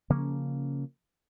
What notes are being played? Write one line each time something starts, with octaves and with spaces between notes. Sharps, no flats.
C#3 F3 A#3 C#4